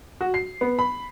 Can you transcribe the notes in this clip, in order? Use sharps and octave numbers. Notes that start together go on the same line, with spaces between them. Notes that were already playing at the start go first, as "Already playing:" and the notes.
F#4
C7
B3
B5